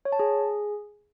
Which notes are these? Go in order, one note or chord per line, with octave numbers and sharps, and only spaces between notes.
C#5
A5
G#4